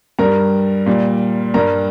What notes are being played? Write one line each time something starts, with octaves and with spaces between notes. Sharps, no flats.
G2 G3 A#4 A#5
A#2 G3
G2 G3 A#4 A#5